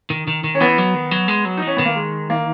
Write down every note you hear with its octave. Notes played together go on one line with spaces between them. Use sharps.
D#3
D#3
D#3
C#4
E3 B3
F#3
D#3
F#3
G#3
F#3
D#4
E3
C#4
D#3 B3
A#3
G#3
A#3